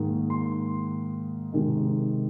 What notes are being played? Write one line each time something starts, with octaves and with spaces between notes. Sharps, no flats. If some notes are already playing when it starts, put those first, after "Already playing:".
Already playing: G#2 D#3 A#3
C6
C3 D#3 G#3